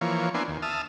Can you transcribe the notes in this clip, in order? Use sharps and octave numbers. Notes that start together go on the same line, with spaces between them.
E3 F3 A#3 C#5
A#3 B3 D4 E4 G#5 C6
D#2
E5 A5 D#6 F6